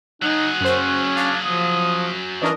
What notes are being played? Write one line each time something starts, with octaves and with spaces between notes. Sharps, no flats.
F#3 D#4 G#4 F#5
F#2 C#4 C5
D4 F5
F3 D#6
E3 C#4 D4 A#4 D#5